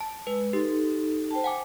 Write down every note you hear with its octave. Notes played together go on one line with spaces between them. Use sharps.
A5
G#3 B4
D#4 G4 A4
C5 G5 A5
F#5 G#5 D6